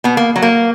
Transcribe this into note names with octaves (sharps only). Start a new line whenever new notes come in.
B2 B3
A#3
F#3
A#3